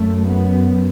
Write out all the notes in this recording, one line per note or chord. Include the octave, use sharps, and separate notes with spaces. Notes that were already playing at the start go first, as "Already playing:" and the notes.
Already playing: F#2 A3
B3